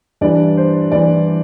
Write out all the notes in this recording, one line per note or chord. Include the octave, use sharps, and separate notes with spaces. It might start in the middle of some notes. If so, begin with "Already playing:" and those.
G2 E3 D5
C5
G2 E3 D5